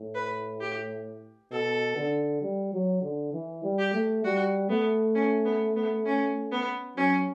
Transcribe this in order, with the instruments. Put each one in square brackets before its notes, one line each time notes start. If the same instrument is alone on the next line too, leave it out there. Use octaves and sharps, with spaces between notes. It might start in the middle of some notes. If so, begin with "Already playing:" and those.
Already playing: [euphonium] A2
[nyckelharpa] B4
G4
[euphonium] B2 [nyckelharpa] A4
[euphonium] D3
G3
F#3
D3
E3
G3
[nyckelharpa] G4
[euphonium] A3
[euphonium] G3 [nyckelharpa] F#4
[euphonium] A3 [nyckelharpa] B3
[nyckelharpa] C#4
B3
B3
C#4
B3
[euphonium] F#3 [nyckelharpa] C#4